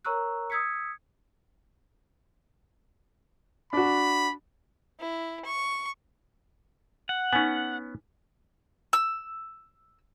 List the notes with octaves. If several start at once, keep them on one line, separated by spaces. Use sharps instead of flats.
A#4 C#5 A#5 C#6 E6 F#6
D#6 E6 G#6 B6 C#7
D4 F#4 B5
E4
C#6
F#5
B3 C#4 D#4 G#5
E6